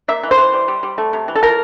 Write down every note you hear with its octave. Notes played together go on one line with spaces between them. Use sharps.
A#3 E5
E3
C5
E3
G3
G3
G3
A3
C3
E3
A4
F3 A#4